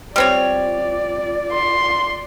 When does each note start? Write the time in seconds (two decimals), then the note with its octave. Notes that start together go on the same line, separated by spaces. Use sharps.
0.16 G3 C4 F4 C#5 D5
1.52 C6